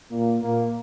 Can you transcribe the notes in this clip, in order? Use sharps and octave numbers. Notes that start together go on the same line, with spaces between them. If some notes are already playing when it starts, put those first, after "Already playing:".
A#2 A#3
A#2 A#3